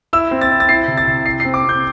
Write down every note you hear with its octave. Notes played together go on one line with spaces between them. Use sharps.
E4 E6
C4
A6
E4
A6
E4 C7
C3
A6
C3
E4 C7
C7
C4
D6
C4
G6